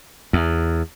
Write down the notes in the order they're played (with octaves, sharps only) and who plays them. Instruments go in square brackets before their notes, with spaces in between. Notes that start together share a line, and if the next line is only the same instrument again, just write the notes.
[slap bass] E2